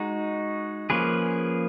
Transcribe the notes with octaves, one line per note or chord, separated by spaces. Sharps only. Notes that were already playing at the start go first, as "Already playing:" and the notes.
Already playing: G#3 D#4 F#4
F3 A#3 C#4 G#4 B4